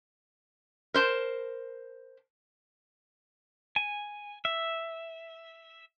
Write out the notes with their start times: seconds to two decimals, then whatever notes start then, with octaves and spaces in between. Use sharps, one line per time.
0.94 A#4 C5 A5
3.76 G#5
4.45 E5